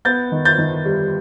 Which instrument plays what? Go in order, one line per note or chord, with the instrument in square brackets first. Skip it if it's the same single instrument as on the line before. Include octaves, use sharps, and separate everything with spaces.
[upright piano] B3 G6 A6
D#3
G6 A6
D#3
G3